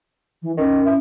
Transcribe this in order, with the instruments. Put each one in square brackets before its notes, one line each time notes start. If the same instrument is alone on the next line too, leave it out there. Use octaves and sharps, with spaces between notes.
[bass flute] E3
[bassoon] D#3 [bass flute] C#4
[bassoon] E4